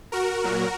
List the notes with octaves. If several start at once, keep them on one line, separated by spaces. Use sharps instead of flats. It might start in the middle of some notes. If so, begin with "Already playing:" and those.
F#4 A#4
A#2 F#3